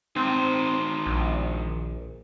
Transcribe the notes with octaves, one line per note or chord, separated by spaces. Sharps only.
D#3 C4 C5
A#1